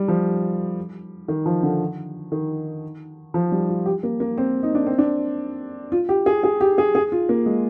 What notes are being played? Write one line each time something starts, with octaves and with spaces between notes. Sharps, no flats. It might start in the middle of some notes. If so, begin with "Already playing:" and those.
Already playing: G3
F3
D#3
F3
D3
D#3
F3
G3
F4
G4
A#3
A#3
C4
D#4
D4
C4
D4
F4
G4
G#4
G#4
G4
G#4
G#4
F4
A#3
G#3